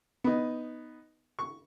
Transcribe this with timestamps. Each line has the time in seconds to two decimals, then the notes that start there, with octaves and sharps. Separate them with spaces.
0.24 B3 D#4
1.39 C#6